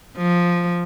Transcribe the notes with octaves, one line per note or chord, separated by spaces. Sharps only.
F3